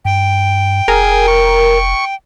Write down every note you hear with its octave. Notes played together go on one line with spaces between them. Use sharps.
G2 G5
F1 G#4 A#4
C#6